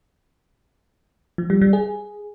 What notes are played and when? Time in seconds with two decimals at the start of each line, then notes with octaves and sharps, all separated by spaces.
1.38 F3
1.50 G3
1.62 G3
1.73 G#4